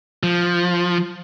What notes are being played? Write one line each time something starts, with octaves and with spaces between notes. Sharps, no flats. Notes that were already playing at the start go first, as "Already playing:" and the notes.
F3